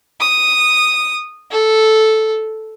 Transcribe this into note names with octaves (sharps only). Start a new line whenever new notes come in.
D#6
A4